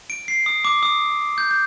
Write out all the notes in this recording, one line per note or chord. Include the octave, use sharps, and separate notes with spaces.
D7
C7
D#6
D6
D#6
G6
G6